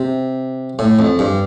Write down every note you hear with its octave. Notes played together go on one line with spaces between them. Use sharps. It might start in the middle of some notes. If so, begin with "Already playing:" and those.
Already playing: C3
A2
F2
G2